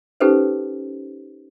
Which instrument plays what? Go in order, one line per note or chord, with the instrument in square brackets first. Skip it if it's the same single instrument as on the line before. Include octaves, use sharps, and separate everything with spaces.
[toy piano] C#4 D#4 G4 A4 B4 C5